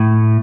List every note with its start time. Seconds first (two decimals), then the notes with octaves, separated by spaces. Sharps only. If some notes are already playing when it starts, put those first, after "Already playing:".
Already playing: A2